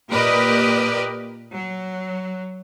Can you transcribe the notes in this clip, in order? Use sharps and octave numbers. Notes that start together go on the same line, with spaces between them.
A#2 G4 A#4 B4 D5 D#5
F#3